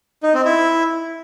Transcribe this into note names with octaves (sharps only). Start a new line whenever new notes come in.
D#4
C4
E4